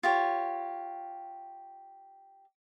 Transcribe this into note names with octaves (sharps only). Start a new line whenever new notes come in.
F4 G4 C#5